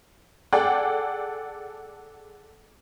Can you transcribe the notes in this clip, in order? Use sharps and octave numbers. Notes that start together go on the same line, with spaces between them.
G#4 A4 D5 F#5 G5